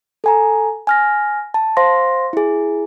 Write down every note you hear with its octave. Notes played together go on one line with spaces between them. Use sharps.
A4 G#5 A#5
G#5 F6 A#6
A5
C5 F5 C6 A#6
E4 G#4